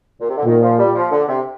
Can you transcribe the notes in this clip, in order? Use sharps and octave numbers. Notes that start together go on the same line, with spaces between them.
A#2
C3
D3
A#2 D#3
F3
G3
F3
D3
C3